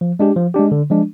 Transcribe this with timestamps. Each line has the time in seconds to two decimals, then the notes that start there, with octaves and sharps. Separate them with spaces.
0.01 F3
0.19 G#3 D4 G4
0.36 F3
0.54 G#3 D4 G4
0.71 D3
0.90 F3 G#3 D4